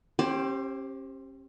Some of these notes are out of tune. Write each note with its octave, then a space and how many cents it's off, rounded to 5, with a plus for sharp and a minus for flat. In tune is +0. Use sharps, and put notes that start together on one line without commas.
C#4 -40 G4 +0 C5 +10